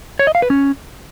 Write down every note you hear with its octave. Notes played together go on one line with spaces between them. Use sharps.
C#5
D#5
F5
B4
C#4